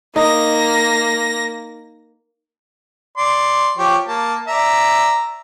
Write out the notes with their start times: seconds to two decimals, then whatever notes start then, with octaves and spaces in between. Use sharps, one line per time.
0.16 A#3 D#4 A#6
3.17 D5 C6
3.77 F3 G4 C#5
4.07 A#3 A5
4.47 D5 E5 A#5